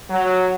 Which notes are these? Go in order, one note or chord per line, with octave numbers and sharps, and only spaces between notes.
F#3